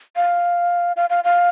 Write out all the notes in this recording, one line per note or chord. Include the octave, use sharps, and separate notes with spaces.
F5
F5
F5
F5